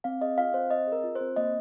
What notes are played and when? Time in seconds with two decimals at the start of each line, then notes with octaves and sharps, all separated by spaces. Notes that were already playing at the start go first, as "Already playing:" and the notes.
0.04 C4 F5
0.21 G#4 D#5
0.38 F4 F5
0.54 C4 C5
0.70 C4 D#5
0.87 G#4 A#4
1.04 F4
1.15 C5
1.21 C4
1.36 A#3 D#5